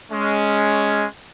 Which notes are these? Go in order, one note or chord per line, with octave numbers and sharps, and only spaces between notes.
G#3 C#4